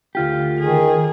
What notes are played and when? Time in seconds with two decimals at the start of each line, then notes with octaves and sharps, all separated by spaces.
0.15 D2 F4 G4
0.59 D#3 G#4